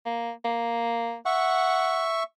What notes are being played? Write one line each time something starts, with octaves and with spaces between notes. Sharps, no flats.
A#3
A#3
E5 F#5 C#6